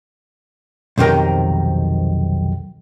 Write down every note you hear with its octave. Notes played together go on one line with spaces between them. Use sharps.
B1 F2 C3 D#3 A#4 G5